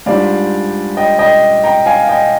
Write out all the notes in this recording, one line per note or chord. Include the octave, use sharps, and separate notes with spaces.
G#2 G3 D4 F4 D5 F5
D#5 G5
D#5 G5
G5 A#5
F5 G#5
F5
D#5 G5